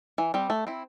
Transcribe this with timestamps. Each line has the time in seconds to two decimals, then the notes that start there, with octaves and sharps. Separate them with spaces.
0.18 E3
0.34 G3 C4
0.50 A3
0.67 C4 E4